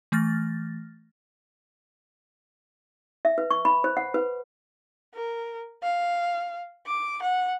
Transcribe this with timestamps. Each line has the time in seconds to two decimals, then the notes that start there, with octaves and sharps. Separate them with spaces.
0.12 E3 A3 F6 A6 A#6
3.25 E5
3.38 B4
3.50 C#6
3.65 B5
3.84 C5
3.97 F#5
4.14 B4
5.14 A#4
5.83 F5
6.87 D6
7.22 F#5